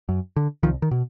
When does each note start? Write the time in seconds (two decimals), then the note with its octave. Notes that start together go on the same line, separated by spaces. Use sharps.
0.09 F#2
0.36 D3
0.63 C2 D#3 F3
0.82 D#3
0.91 B2